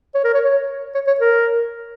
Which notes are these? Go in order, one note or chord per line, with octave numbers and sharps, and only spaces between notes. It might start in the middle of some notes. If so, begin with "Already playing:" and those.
C#5
A#4
C#5
C#5
C#5
C#5
A#4